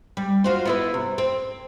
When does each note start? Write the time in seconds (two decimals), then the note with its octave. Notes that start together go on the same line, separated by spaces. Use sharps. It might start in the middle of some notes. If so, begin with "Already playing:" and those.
0.17 G3
0.44 F4 F#4 C5
0.65 B3 E4 B4
0.94 C3
1.18 C4